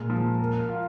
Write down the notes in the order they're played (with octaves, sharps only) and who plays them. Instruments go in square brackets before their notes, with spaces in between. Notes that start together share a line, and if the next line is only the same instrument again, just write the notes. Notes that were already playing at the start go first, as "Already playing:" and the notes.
Already playing: [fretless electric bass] A#2 [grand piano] G#3 A#4
[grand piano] F3
A#4
F4